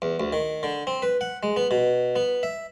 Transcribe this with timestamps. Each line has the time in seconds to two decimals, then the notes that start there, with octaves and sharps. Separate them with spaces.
0.02 E2
0.20 D2
0.33 D#3
0.63 D3
0.87 C4
1.02 B4
1.21 F#5
1.43 G#3
1.56 B3
1.71 B2
2.16 B3
2.43 E5